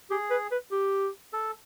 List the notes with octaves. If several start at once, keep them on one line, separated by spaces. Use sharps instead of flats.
G4 G#4
B4
B4
G4
A4